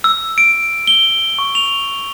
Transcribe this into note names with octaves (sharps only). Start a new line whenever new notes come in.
E6
D7
G7
C#6
F7